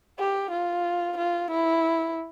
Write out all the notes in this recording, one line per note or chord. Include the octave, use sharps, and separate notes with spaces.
G4
F4
F4
E4